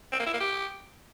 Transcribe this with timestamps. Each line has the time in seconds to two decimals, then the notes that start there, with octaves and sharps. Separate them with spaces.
0.12 C4
0.20 A#3
0.27 E4
0.34 A#3
0.41 G4